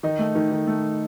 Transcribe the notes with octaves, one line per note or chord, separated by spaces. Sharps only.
D#3 D#4
A3
D#3
D#3
A3